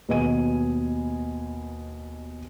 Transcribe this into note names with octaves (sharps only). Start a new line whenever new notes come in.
D#2 B2 B4 D#5 G#5 D#7